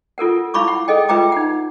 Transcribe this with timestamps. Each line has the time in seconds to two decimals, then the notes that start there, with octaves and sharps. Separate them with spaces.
0.18 F4 A4 A#4 F#5
0.54 E4 F5 B5 C#6 D6
0.68 F#5
0.88 G#4 A4 D#5 G5
1.09 F4 B4 E5 G5 A#5 D6
1.32 D#4 F#5